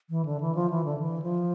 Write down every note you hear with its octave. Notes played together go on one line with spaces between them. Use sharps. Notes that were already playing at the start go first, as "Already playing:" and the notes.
E3
D3
E3
F3
E3
D3
E3
F3